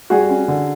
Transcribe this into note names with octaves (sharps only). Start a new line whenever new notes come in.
G3 F#4 G#4
C#4
D3